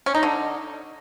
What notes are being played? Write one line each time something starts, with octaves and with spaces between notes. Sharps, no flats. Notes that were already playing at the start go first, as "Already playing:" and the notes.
C#4
D#4
D3